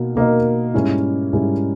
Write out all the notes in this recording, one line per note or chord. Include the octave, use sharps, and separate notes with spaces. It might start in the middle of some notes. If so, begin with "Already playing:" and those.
Already playing: B2 A#3 D#4
B2 A#3 D#4 A#4 D#5
G#2 G3 C#4 E4
G#2 G3 C#4 E4